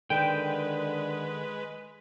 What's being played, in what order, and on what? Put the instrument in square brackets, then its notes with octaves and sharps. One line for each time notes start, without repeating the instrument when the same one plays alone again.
[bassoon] D3 [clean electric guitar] D#3 [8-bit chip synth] G#3 B4 [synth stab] G5